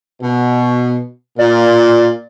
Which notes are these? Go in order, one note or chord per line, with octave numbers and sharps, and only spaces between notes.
B2
A#2 D5